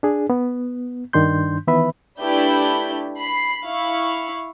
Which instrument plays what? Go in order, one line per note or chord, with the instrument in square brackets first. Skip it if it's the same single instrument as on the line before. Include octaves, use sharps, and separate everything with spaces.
[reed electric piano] D4 G#4
B3
G2 D#3 D4 C6 G6
D#3 E3 B3 B4 E5 B5
[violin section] A3 D4 E4 G4 B4 G6
B5 C7
E4 F5 C#6